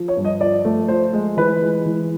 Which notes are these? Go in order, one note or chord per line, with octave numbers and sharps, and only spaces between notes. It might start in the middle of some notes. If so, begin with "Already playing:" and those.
Already playing: F3
C#5
G2
D#5
F3 D5
A3
F3 C5
G#3
E3 B4
G#3
E3